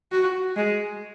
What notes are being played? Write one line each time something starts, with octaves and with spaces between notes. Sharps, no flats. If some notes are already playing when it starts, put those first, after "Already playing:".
F#4
G#3